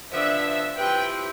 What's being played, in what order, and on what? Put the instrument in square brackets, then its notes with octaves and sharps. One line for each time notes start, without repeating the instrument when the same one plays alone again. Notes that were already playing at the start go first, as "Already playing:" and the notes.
[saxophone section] D3 F3 B3 D4 [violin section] E5
[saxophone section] F3 C4 E4 G4 B4 [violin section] G5